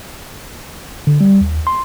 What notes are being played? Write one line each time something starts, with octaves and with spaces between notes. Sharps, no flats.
D3
G3
D#2
C6